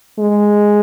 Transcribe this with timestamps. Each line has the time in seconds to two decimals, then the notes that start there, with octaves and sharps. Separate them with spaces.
0.19 G#3